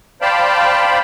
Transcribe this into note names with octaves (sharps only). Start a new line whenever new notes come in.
C5 D5 F5 G5 A5 B5